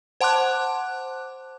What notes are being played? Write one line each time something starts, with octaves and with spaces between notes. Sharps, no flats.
C5 F#5 A5 C6 D6 F#6